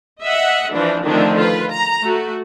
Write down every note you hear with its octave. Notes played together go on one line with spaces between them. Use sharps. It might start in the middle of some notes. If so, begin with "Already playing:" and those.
D#5 E5 F#5
E3 F3 D4
D3 D#3 F3 A3 C4 D4
F4 B4
A#5
A3 F#4